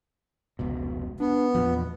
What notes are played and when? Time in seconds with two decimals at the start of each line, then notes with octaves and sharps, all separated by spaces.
0.59 F1 C#2 B2
1.20 B3 D4
1.55 E2 A#2 F3